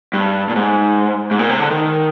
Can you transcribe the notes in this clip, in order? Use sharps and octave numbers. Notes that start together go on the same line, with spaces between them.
G2
A#2
G#2
G#2
A#2
C3
D3
D#3